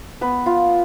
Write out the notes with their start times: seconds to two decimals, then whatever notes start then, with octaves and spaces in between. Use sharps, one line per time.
0.21 B3 B4
0.46 F4